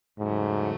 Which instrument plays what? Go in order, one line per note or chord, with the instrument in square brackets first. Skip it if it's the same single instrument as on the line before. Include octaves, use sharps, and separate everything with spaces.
[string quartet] E2 C#3 F#3 A3 [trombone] G#2